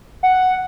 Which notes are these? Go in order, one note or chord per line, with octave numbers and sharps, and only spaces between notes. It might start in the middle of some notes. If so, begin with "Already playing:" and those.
F#5